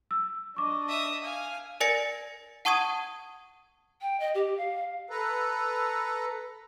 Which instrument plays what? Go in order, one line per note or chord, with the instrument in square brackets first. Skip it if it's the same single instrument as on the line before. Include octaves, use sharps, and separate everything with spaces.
[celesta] E6
[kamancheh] D4 D#5 [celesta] C#6 D6
[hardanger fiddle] E5 D#6
[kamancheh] F5 F6 [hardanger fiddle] G#5
[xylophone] A#4 D5 G#5 A6 A#6 C#7
F#5 A5 C#6 D#6 G#6 D#7
[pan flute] G5
D#5
G4
F5
[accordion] A4 B4 A#5